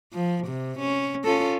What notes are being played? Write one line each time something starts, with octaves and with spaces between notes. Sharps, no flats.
F3
C3
C#4
C#4 F4 A4